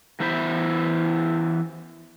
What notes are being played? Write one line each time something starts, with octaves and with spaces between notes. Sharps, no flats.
E3 B3 E4 C5 E5